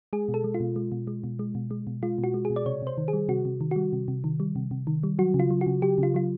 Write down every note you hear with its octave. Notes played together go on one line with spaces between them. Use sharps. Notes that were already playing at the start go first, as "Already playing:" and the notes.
G#3 G#4
B2
A4
G#3
F4
B2
G#3
B2
G#3
B2
G#3
B2
G#3
B2
G#3 F4
B2
F#4
G#3
G#4
B2
D5
C3 C#5
C3 C5
D#3
G#4
G3
C3 F#4
C3
D#3
G3 F#4
C3
C3
D#3
G3
C3
C3
D#3
G3
F#3 F#4
C#3
F4
F#3
F#4
C#3
F#3 G4
C#3 F4
F#3 F4